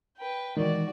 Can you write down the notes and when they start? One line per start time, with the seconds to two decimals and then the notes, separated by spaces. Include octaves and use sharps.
0.18 B4 G5
0.57 D#3 E3 G#3 F#4 D5